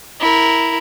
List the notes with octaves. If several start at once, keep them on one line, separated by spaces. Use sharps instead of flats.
E4 A#4